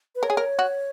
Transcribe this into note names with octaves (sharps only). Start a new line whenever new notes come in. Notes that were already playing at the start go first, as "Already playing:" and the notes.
B4
A#4 C#5
G#4
A#4
F#4